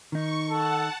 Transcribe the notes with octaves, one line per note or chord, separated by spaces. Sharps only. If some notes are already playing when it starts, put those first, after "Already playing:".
D#3 D#4 C#6
A4 F#5 A5